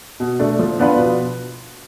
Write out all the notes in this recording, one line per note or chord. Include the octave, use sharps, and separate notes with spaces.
B2
A3 D4
F3
B3 D4 F4 B4
B2